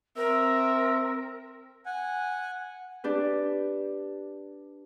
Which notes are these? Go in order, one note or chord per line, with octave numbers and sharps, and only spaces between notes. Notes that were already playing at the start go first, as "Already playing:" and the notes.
C4 A#4 E5
F#5 G#5
D4 G4 B4